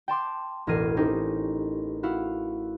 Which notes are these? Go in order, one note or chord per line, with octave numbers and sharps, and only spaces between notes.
G5 A5 C6 D6
E1 A1 A#4 G#6 C7 D#7
C4 C#4 D#4 G4 C5
E4 F#4 F5